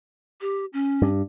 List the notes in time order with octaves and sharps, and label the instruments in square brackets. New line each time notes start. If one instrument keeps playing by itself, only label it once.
[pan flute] G4
C#4
[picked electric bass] G2